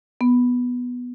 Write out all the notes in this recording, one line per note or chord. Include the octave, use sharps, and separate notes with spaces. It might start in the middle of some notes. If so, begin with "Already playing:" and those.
B3